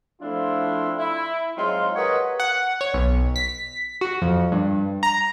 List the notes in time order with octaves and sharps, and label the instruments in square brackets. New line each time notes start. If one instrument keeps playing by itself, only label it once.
[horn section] F3 A3 C4 D4 E4 F4
E4
F#3 G#3 C4 D#4 F4
G4 A#4 B4 C#5 D#5 F#5
[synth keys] F#5
C#5
B1
B6
F#4
F2
G2
A#5